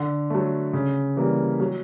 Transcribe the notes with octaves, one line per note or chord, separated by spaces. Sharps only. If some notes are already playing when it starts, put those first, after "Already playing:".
Already playing: D3
F#3 A3
C#3
E3 G3 A#3
F#3